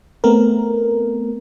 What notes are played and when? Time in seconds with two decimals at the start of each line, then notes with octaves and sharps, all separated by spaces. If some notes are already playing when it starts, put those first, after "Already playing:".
0.24 A3 B3 C4 A#4